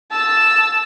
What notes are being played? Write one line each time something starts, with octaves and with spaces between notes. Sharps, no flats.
A5 E6